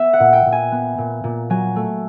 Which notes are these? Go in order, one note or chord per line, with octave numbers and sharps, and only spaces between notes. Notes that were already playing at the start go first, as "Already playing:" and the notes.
Already playing: B3 E5
F#5
A#2
G5
A#2
G#5
B3
A#2
A#2
F#3 G#5
A3